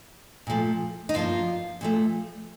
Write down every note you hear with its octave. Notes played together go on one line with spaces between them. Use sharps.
A#2 F3 A3
D#4
G2 F3 A#3 F4
A#2 F3 A3